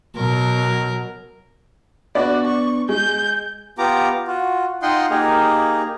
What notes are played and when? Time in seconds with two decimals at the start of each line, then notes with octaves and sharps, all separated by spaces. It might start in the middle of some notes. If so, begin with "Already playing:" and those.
0.16 B2 F#3 A#4
2.15 B3 D4 F#4 D5
2.47 C#6
2.89 G#3 G#5 G6
3.78 B3 F4 G4 A#5 D6
4.27 F4 F#4
4.82 D#4 F4 D#5 F#5 G5 C6
5.10 A#3 D#4 G4 G#4 A#4